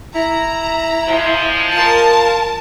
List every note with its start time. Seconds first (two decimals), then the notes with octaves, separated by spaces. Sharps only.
0.15 E4 A#5
1.07 F3 G#3
1.74 F4 A#4 A5